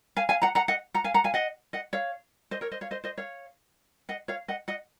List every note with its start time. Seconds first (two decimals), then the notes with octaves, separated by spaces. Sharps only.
0.17 F5 G#5
0.29 F5 G#5
0.42 F#5 A#5
0.55 F#5 A#5
0.68 D#5 F#5
0.94 F#5 A#5
1.04 F5 G#5
1.14 F#5 A#5
1.24 F5 G#5
1.34 D#5 F#5
1.73 D#5 F#5
1.93 C#5 F5
2.51 C5 D#5
2.61 A#4 C#5
2.71 C5 D#5
2.81 C#5 F5
2.91 C5 D#5
3.04 C5 D#5
3.18 C#5 F5
4.09 D#5 F#5
4.28 C#5 F5
4.48 D#5 F#5
4.68 D#5 F#5